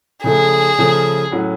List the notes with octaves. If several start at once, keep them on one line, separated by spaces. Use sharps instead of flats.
C#3 F3 A3 G#4
C#3 F3 A3
A2 F#3 C#4 F#4